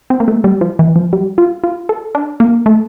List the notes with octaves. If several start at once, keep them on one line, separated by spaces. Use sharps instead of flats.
C4
A#3
A3
G3
F3
E3
F3
G3
F4
F4
A4
D4
A#3
A3